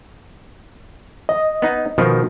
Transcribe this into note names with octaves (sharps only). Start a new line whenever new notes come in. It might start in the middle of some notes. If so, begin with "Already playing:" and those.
D#5
B3 D#4
B2 D#3 F3